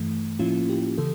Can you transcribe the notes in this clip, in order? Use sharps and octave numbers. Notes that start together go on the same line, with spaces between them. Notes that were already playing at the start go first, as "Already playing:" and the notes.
Already playing: G2 E3 A3
A2 F3 A#3 C#4 E4 F4
G4
C#3 E3 A4